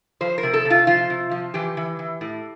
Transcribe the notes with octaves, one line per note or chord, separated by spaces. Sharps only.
F3 C5
A#4
C3
A4
C3
F4
F3 F4
C3
F3
E3 G4
E3
E3
A2